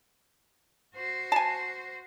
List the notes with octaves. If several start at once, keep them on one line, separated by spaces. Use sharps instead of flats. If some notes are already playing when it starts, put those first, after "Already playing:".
F#4 C5
G#5 A5